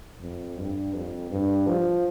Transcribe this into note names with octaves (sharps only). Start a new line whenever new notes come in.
F2
G2
F2
G2
F3